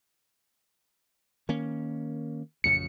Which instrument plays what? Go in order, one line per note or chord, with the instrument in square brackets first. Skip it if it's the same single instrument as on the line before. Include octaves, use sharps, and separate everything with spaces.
[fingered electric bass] D#3 A#3 C#4
[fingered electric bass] A1 F2 C#3 [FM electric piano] C#7